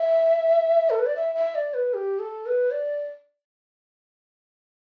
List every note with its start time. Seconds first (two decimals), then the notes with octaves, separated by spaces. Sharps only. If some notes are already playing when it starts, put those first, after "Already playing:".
Already playing: E5
0.90 A4
0.99 B4
1.06 D5
1.16 E5
1.35 E5
1.55 D5
1.74 B4
1.94 G4
2.19 A4
2.46 B4
2.71 D5